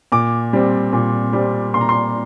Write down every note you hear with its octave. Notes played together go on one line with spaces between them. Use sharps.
A#2 D6
G3 C4
A#2
G3 C4
A#2 C6
A#5
C6